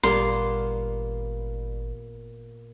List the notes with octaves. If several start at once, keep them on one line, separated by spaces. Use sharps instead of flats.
G#1 A#2 G3 A#3 B3 C6